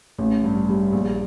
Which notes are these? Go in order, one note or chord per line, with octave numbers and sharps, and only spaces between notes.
A1
G2
G3
A#1